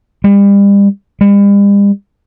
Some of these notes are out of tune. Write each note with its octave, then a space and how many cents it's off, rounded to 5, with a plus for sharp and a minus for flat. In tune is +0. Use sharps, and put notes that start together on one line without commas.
G3 +35
G3 +45